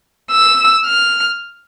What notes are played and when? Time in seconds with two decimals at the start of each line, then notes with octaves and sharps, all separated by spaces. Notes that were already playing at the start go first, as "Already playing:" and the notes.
0.31 E6
0.86 F6